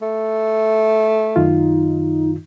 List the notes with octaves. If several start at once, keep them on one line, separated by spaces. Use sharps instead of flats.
A3
F#2 D#3 D#4 F4